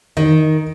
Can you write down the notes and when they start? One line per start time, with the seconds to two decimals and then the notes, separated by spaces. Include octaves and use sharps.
0.17 D#3 D#4